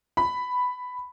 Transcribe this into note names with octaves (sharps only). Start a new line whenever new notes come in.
B5